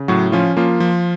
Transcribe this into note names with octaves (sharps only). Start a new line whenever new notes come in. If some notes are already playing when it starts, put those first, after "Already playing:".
Already playing: C#3
A2 F#3 F#4
F3 C#4 F4
F3 A#3 F4
F3